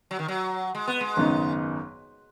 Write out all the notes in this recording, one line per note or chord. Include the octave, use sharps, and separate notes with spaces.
F#3
D#3
F#3
G#3
B3
G#3
G#1 F#2 C#3 B3 D#4